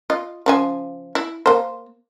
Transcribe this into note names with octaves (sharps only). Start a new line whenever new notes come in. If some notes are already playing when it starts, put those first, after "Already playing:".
F4 D#5
C#3 F3 G#5
E4
A#3 C5